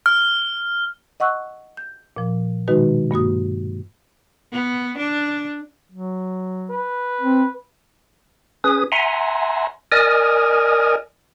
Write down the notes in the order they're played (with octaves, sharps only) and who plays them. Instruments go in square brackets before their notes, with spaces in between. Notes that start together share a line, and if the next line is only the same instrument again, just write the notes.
[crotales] F6
[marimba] D#5 F#5 C#6 E6 F#6
G6
A#2 F3
B2 D#3 G#3 D#4 F#4 B4
G2 A#3 F#4 D#6
[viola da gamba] B3
D4
[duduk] F#3
[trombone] B4
[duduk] C4
[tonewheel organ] C#4 G#4 B4 D#6
E5 F#5 G#5 A#5 C6
A#4 D5 D#5 G#5 D#6 F6